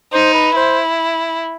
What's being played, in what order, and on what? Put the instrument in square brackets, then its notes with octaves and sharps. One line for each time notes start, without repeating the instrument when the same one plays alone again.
[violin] D#4 [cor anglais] C5
[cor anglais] B4
[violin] E4 [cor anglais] C5